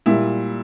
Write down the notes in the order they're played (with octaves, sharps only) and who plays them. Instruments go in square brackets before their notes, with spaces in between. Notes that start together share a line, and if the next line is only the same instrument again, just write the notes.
[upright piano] A#2 G3 E4